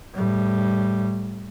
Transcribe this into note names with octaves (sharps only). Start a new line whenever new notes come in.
A2 G3